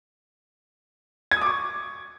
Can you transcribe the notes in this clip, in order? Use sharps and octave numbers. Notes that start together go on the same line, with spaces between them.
G#6
D#6
D6
C#6